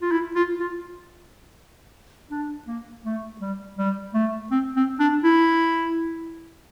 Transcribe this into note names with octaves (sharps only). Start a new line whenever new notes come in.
F4
E4
F4
F4
D4
A#3
A3
G3
G3
A3
C4
C4
D4
E4